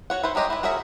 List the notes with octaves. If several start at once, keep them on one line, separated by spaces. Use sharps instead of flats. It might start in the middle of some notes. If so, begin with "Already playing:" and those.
F#4 C#5 F#5
E4 B4 C5
F#3 G#3 G4 D#5
E4 B4
F#4 G#4 A#4 C#5 E5